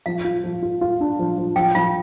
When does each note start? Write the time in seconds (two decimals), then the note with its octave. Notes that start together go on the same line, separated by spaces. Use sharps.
0.06 F3 F5
0.24 F4
0.44 F3
0.62 F4
0.81 F4
1.01 D4
1.19 F3
1.38 F3
1.56 F3 G5
1.75 F3 F4